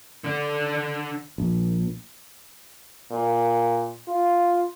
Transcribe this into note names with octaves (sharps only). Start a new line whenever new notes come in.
D3 D4
A#1
A#2
F4